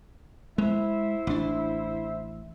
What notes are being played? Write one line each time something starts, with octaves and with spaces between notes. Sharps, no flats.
G#3 E4 C5 E5
A1 D4